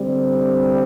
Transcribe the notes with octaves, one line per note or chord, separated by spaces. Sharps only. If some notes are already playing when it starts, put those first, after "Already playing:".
Already playing: D3 G3 C4